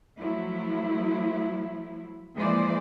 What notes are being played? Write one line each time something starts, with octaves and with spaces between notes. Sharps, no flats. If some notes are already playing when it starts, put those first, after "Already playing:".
F3 F#3 A3 E4
E3 F3 G#3 A#3 C5 D5